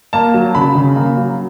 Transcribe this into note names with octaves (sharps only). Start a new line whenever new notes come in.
A#3 A5
F#3
C#3 B5
C#3
A#3
F#3